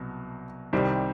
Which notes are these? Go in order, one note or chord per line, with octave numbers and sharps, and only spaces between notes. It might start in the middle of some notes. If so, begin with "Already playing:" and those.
Already playing: C2 B2 F#3
C2 C3 D#3 G3 C4